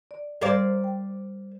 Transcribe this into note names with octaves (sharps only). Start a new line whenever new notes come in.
D5
G3 A#4 C5 D5 F5 G#6
G5